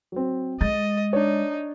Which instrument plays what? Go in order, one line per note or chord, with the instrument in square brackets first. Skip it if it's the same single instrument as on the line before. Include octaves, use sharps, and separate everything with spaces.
[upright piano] F#3 C4
[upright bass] G#3 [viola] D#5 [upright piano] A6
[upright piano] D4 C#5 [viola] D#4